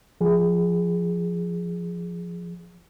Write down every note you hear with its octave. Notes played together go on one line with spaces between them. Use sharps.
F3 G#4